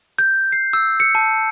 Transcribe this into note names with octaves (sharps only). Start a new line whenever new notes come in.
G6
C7
E6
C#7
A5